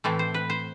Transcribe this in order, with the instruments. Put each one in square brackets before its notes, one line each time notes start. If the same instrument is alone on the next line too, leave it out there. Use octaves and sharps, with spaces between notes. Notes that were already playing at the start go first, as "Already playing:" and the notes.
[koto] A2 E3 A3 C4
C5
B4
C5